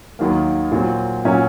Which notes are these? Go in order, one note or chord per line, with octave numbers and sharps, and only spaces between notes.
D#2 D#3 F#3 A#3
A#2 F#3 C4
A#2 F#3 C#4